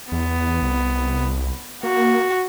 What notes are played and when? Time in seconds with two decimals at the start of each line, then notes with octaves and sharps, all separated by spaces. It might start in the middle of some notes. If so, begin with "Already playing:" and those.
0.12 E2 B3
0.62 C2
1.83 A#3 F#4